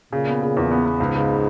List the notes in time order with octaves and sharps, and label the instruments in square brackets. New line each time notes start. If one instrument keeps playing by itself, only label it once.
[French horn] A#2 [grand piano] C#3
[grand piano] B3
C#3
E2
B3
B3
[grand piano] C#2 [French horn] G#2
[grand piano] C#3